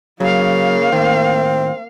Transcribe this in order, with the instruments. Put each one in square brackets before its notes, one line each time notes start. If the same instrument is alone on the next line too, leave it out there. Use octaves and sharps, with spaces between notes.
[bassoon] C#3 [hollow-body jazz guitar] F#3 [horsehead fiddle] A#3 F5
[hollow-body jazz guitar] A2 D#3 [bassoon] C4